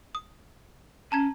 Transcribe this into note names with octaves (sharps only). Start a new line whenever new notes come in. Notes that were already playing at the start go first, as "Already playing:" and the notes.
D#6
C#4 A5 A#5 G#6